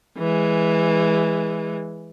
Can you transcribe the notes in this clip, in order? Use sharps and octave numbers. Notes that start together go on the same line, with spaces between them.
E3 G#3